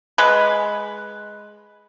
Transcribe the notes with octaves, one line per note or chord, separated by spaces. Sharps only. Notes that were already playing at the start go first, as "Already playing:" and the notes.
G#3 B4